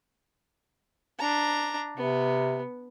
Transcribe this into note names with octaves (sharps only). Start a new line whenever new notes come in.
D4 A#5
C3 B3